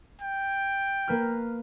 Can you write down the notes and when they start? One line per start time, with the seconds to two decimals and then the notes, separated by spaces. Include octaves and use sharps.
0.21 G5
1.08 A#3 B4 F6